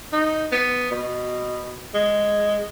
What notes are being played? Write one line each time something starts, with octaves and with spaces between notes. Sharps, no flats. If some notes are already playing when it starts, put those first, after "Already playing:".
D#4
B3
B2
G#3